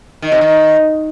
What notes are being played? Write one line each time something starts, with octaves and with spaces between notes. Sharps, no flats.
D#3
C3
D#3